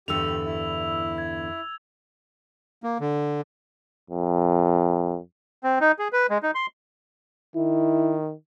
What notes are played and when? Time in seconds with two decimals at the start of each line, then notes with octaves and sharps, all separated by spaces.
0.08 E2 G2 D3 G4 E6 F7
0.46 E4
1.18 G#6
2.83 A#3
3.00 D3
4.10 F2
5.64 C4
5.81 D#4
5.99 G#4
6.13 B4
6.30 G#3
6.43 D#4
6.55 C6
7.56 D#3 E4